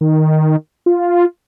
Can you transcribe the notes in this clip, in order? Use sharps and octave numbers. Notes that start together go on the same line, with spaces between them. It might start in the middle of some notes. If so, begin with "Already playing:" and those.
D#3
F4